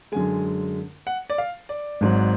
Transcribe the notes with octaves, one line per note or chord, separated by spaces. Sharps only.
F#2 D3 G#3 G#5
F#5
D5
F5
D5
G#1 G#2 F#3